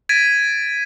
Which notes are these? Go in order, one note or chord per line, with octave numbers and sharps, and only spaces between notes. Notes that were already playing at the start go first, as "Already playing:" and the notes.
G#6 A6 B6 D7 D#7